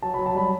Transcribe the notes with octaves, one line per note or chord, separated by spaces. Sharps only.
F#3 A5
F#3 B5
A5
G3 B5